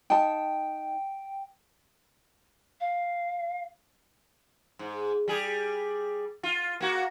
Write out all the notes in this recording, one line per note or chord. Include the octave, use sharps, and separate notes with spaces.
D#4 G5 A5
F5
G#2
G3 G#4
F4
A#3 F#4